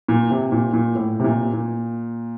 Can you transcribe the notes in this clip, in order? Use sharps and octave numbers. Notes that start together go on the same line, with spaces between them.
A#2
C3
A#2
A#2
A2
C3
A#2
A#2